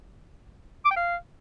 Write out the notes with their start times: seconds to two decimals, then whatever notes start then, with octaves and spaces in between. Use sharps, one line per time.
0.85 D6
0.91 G5
0.96 F5